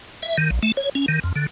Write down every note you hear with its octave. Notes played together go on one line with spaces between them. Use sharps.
E5
D#3
A#1
A3
C#5
C#4
D#3
F2
D3